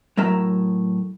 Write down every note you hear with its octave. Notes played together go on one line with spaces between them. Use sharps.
A2 F#3 A#4 E5 A#5